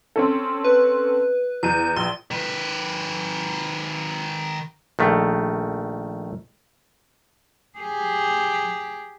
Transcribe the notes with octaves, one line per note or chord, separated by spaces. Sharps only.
C4 C#4 A4
B4
E2 G6 D#7
A#1 C6
D#3 B4
A#1 D#3 A3
G4 G#4